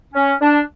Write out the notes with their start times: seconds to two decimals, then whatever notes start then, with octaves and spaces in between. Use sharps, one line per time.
0.13 C#4
0.41 D4